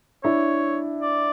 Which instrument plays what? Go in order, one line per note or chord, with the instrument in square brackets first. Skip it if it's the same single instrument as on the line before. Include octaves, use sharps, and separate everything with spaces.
[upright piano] D4 E4 [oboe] C#5
[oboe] D5